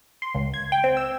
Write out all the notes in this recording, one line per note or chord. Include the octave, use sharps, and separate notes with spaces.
C6
C#2
G#6
G5
C4
E6